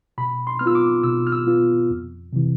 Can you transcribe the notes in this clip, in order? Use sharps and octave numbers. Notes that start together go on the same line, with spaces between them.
B2 B5
C6
B3 F6
F4 E6
D6
B2 E6
F6
E6
B3 F4
F2
C3 E3